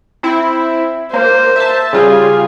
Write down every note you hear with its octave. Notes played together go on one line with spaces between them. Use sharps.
C4 E4
A#3 C5
E5 A5
C#3 G3 F4 G#4